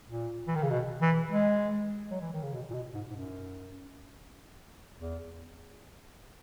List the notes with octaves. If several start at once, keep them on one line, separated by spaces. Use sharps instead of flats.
A#2
E3
D#3
C#3
B2
E3
G#3
F#3
E3
D#3
C#3
B2
A#2
B2
G#2
G#2
F#2
E2